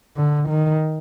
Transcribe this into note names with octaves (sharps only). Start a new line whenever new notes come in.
D3
D#3